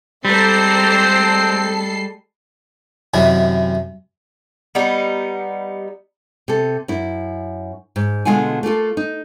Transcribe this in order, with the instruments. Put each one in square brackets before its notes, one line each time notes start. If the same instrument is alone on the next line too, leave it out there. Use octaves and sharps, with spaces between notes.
[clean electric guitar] G3 [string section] G#3 A4 C7 [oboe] C4 [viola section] C5 D5 A#5
[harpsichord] F#2 C3 D#3 E4
[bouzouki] G3 B3 D#4
[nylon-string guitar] C3 A4
F#2 E4
G#2
B2 D3 G#3 F4 F#5 G#5
A3 A#3 F4 A4
D#4